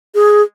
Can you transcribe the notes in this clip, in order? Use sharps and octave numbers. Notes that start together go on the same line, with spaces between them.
G#4